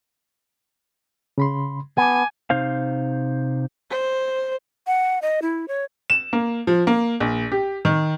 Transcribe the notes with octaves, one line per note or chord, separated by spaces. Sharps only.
C#3 B5 C6
B3 G#5 A5 D6
C3 D#4 C5 F5
C5
F#5
D#5
E4
C#5
E7
A#3
F3
A#3
A#1
G4
D#3